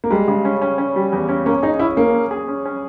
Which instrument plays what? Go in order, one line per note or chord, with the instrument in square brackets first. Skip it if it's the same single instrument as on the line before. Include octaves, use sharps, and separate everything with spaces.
[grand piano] A#3
[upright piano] G3 [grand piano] G#3
[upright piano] C#3
C#4
C#4
C#4
G3
E2
C#4
[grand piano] A#3 [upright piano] C#4
[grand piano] D#4 [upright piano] G#4
[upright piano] C#4 [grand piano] E4
[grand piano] A#3 [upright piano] C#4
[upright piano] C#4
G#4
C#4
C#4